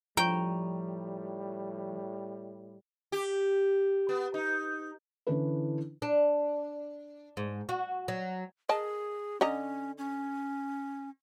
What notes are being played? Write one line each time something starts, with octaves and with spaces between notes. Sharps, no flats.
A2 F3 G3 G5 A#5 C#6
G4
B3
D#4
D3 E3 C#4 D4 E4 B4
D4
G#2
F#4
F#3
G#4 A#4 D#5 A5
D3 C#4 D#5 A#5
C#4